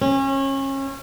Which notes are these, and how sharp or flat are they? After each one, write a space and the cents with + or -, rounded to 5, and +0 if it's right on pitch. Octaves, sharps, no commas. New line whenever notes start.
C#4 -30